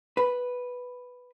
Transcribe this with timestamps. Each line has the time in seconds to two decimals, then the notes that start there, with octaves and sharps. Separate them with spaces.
0.17 B4